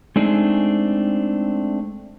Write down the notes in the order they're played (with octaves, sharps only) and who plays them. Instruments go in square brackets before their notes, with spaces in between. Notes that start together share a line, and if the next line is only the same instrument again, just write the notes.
[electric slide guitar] G#3 A3 C4 D4 D#4 G#4